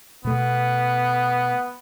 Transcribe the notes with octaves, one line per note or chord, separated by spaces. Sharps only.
B2 A3 B3